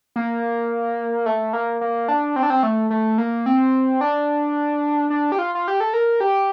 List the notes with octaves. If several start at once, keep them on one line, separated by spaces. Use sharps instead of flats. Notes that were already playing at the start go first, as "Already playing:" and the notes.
A#3
A3
A#3
A#3
D4
C4
D4
C4
A3
A3
A#3
C4
D4
D4
G4
F4
F4
G4
A4
A#4
G4